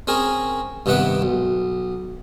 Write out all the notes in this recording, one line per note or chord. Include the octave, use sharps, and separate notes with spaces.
C4 C#4 G#4 A#4
G2 C3 D#3 B3 F#5 D6
B1